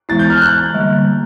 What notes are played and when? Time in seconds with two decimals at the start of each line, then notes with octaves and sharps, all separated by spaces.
0.09 E3 G#3 B3 E4 A6
0.19 G6
0.30 F6
0.41 F#6
0.74 D3 G3 A#3